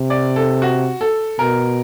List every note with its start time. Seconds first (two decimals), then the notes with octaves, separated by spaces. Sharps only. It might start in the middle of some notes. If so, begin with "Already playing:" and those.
Already playing: C3
0.10 D5
0.36 A4
0.62 F#4
1.01 A4
1.39 B2 A#4